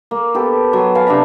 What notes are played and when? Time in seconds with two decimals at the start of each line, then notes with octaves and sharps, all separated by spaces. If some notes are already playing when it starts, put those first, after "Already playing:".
0.11 A#3
0.34 B3 G4 A4
0.73 F#3
0.95 B4 F5 G#5 A5
1.07 C3 D4 A#5 B5